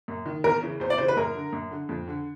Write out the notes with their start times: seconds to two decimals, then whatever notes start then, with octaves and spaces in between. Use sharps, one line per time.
0.08 F#2
0.26 D#3
0.44 E2 A#4
0.62 C#3 E3
0.80 E2 C5
0.90 D5
0.98 C#3 E3 C5
1.08 B4
1.17 F#2 A#4
1.35 D3
1.53 F#2
1.71 D3
1.89 F2
2.08 D3